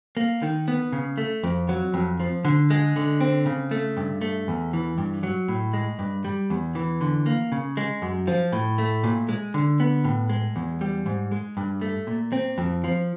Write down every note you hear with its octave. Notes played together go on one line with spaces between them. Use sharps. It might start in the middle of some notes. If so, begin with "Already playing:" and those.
A#3
D#3
B3
C#3
A3
F2
F#3
F2
F3
D3
G#3
D3
C4
C#3
A3
G2
A3
E2
E3
G2
F#3
A2
G#3
G2
G3
E2
E3
D3
A#3
C#3
G#3
F#2
F3
A2
A3
A#2
G#3
D3
B3
A2
G#3
E2
G3
G#2
G#3
G2
A3
A#2
C4
F2
F3